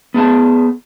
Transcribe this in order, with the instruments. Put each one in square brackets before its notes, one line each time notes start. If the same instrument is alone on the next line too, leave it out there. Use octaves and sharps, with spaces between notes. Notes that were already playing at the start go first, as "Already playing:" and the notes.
[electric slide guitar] B3 G#4 A5